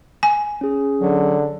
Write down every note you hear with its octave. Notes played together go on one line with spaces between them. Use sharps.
G#5
C#4 G#4
D3 F#3